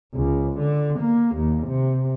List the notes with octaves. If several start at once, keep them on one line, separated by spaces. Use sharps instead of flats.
C#2
D3
A#3
D#2
C3